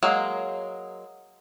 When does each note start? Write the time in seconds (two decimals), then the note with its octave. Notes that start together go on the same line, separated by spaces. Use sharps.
0.03 F#3 G#3 A#3